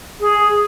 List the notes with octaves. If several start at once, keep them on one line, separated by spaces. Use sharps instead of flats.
G#4